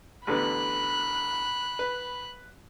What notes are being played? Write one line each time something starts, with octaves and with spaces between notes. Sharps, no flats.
A1 D3 B3 B5 F#6
B4